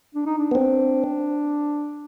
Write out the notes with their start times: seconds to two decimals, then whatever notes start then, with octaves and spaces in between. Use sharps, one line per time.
0.15 D4
0.26 D#4
0.38 D4
0.51 B3
0.55 C4